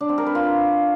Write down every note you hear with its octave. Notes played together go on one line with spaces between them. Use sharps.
D4
C4
A#4
B4
F4